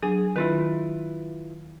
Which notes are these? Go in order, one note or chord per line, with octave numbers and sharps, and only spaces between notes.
F#3 D4 G#4
D#3 E4 F4 B4